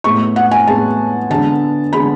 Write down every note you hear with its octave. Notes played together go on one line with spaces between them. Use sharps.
A2 G#3 B3 C#6
F#5
G#5
A2 G#3 B3 A5
D3 G#3 B3 A5
D3 G#3 B3 B5